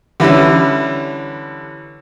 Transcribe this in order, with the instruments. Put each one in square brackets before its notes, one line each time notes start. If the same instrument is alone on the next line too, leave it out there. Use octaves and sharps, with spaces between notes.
[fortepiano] D3 E3 G3 C#4